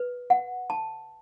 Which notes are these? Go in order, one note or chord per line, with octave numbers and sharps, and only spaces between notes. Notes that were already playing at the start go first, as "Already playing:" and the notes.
Already playing: B4
F#5
A5